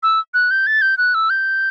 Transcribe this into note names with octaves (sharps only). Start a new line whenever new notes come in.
E6
F#6
G6
A6
G6
F#6
E6
G6